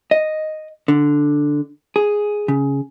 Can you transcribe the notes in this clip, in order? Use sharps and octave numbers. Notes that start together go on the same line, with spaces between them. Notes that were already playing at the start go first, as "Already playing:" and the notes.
D#5
D3
G#4
C#3